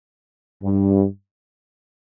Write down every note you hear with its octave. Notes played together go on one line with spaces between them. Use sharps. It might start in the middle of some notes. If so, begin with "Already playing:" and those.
G2